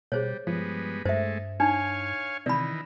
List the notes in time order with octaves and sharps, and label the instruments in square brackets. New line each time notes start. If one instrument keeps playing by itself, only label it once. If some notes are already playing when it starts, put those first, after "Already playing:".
[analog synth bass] B2 [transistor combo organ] G3 [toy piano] G#4 C5 C#5
[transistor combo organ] G2 G#3 B3 [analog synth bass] F3
[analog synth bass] G2 [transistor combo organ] G#3 A3 [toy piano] C5 E5
[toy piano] D4 D#4 [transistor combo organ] C#5 F5 G#5
[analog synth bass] C3 [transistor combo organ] D#3 E3 [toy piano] D5 B5